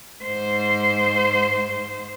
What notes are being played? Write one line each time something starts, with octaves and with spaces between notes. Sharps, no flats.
G#2 C5